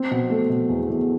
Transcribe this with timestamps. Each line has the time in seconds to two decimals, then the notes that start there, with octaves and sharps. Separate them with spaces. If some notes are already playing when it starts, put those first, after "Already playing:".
Already playing: C4
0.11 B2
0.30 A3
0.50 B2
0.69 E2
0.89 E2